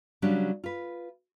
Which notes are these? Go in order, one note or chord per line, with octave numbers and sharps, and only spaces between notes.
C#3 F#3 G3 C#4 D4
F4 B4